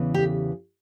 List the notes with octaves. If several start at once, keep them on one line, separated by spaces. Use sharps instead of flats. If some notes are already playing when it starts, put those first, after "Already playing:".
Already playing: E2 C#3 E3 B3
G4